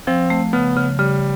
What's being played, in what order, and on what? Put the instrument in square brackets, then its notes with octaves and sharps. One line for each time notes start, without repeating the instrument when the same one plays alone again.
[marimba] F3 [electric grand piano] C4
[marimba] A3
[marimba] C#3 [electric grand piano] B3
[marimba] C#3
[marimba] C#3 [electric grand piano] G3